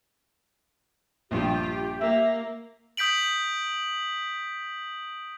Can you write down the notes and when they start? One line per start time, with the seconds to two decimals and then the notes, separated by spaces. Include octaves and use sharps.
1.31 A#1 G2 F3 F4 G4
2.00 A#3 E5
2.97 D#6 G6 B6 D7 F#7